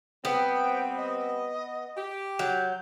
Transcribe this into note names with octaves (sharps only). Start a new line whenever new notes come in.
G3 B3 C4 G5
D#5
G4
F#3 G6